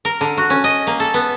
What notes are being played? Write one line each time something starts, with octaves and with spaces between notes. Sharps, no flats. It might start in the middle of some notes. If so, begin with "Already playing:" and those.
A#4
D3
F#4
C#4
D#5
A#3
A4
B3